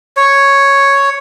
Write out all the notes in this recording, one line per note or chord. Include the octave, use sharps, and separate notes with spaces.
C#5